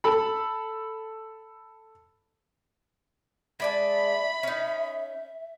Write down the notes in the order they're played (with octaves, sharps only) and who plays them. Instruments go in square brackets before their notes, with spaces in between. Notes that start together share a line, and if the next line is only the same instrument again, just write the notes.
[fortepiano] A4 B5
[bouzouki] G#3 D5 A5 [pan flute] E5 [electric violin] B5
[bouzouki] C#4 D#4